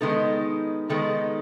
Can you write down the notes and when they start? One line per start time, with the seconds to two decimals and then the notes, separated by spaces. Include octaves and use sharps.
0.01 D#3 G#3 B3 D#4 A4
0.90 D#3 G#3 B3 D#4 A4